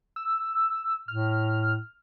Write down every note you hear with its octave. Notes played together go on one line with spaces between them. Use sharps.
E6
A2 F6